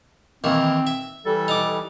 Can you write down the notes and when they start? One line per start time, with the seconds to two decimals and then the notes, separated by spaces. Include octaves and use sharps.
0.44 D#2 D#3 E3 C4
0.87 E5
1.26 E3 G3 A4
1.48 D#4 D6